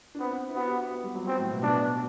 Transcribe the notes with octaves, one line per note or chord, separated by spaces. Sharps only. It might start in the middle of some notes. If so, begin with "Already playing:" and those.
D4
B3 C4
E4
B3 F#4
G4
F#4
B3
G3
F#3
F#3 C4
A2
B2
B2 D4